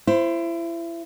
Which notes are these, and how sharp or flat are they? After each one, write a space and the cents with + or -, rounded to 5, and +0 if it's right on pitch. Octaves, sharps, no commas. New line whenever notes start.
E4 +30 C5 +0